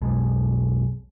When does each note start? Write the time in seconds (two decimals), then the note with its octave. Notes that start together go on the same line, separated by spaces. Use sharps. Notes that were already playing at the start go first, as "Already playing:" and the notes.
0.02 B1 F2 B2 G#3